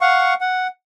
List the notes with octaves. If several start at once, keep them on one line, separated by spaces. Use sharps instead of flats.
F5 F#5 C#6
F#5